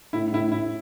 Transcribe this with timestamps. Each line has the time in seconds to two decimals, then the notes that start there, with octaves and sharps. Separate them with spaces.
0.13 A2 E4
0.32 A2 E4
0.52 A2 E4